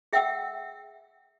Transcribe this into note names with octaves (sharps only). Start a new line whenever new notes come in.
G#4 E5 F#5 G5 E6